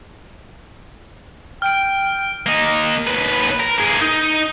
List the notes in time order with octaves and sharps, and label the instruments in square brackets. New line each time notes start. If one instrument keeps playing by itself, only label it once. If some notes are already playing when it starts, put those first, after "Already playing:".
[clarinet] G5 [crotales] F6 D7
[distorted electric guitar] A#3 D#5
D#2 B4
A#4
A#3 G#4
D#4